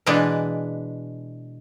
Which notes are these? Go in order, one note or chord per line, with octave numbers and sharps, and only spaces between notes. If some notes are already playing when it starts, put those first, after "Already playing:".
B2 E3 G#3 D4 B4